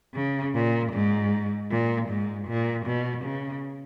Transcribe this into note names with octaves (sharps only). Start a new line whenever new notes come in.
C#3
A#2
G#2
A#2
G#2
A#2
B2
C#3